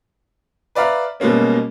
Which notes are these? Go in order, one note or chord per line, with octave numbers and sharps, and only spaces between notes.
B4 D5 E5 F5 A#5
B2 G3 G#3 A#3 C#4